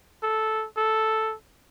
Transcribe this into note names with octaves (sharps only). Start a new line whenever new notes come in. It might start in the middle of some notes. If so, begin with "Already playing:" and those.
A4
A4